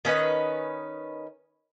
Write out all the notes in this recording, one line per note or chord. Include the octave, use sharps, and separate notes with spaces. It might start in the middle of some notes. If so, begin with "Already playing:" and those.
D#3 C#4 B4 D#5